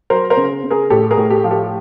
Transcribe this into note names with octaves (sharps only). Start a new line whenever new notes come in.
F#3 A#4 C5
A#4 C5
C#3
C#3
G#4 A#4
A2 G4 A4
G#4 A#4
A2
G4 A4
F3
G4 A4